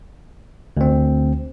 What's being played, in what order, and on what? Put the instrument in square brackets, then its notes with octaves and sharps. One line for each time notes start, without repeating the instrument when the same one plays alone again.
[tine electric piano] D2 C4